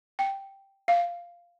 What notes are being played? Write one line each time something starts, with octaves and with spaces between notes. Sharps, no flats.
G5
F5